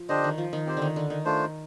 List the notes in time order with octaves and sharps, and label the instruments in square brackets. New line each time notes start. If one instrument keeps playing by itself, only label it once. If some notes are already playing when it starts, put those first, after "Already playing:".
Already playing: [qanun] F3
[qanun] D3 [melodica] D4 G4 C5 D#5
[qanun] D#3
F3
D#3
[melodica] C4 G4 C5
[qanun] D3 D#3
D3
D#3
[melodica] A3 D4 F4 C5